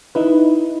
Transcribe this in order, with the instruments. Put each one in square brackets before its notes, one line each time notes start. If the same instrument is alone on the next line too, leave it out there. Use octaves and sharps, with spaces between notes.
[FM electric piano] D#4 E4 B4